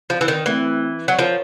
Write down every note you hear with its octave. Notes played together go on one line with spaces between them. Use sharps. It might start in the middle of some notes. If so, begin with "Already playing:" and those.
F3
E3
D#3
E3 A3 C4 E4
F#3
F3 F4 A#4 C#5